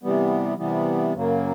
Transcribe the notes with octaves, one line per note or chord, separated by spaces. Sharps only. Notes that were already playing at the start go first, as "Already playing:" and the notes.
C3 E3 G3 B3
C3 E3 G3 B3
F#2 C#3 F#3 A#3